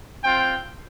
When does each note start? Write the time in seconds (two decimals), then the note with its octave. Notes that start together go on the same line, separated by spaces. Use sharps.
0.25 C4 F4 G5